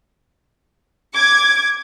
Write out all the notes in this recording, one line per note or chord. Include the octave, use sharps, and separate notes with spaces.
D6 G#6